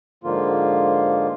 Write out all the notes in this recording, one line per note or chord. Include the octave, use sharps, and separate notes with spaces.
G#2 D3 F3 A#3 F4